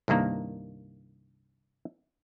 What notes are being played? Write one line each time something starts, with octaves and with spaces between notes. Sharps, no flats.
C2 G2 D#3 A#3 A#5